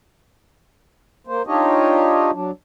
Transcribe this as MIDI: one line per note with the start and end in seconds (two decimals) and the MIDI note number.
1.27 1.42 58
1.27 1.42 72
1.47 2.31 62
1.47 2.31 63
1.47 2.31 65
1.47 2.31 67
1.47 2.31 73
1.47 2.31 75
2.33 2.51 54
2.33 2.51 62